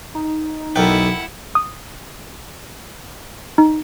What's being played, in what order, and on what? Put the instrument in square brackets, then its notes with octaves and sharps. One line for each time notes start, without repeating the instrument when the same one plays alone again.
[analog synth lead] D#4
[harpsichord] B1 B3 [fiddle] E4 F#5 [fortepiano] A4 A#4 G5
[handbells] D#6
D#4